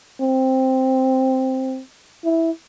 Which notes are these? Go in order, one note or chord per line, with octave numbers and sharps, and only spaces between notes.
C4
E4